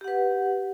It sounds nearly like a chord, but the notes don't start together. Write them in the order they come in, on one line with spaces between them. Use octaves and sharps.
G4 F#5 B4